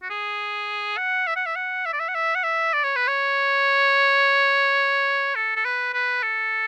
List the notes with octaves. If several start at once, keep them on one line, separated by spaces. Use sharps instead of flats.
F#4
G#4
F#5
E5
F#5
E5
F#5
E5
D5
E5
F#5
E5
F#5
E5
D5
C#5
B4
C#5
A4
A4
B4
B4
A4